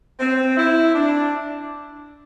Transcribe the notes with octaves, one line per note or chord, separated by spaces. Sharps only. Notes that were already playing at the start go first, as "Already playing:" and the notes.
C4
E4
D4